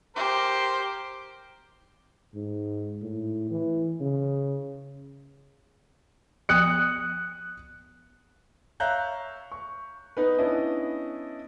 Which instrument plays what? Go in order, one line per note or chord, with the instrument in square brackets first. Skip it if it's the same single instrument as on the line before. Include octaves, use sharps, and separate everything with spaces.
[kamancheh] G4 [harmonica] A#4 C5
[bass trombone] G#2
A2
E3
C#3
[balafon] F3 B3 [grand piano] D#6 F#6 C#7
[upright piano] C#5 E5 F5 A#5 F#6 G6
C#6
B3 D#4 B4
B3 C#4 D4 E4 D#5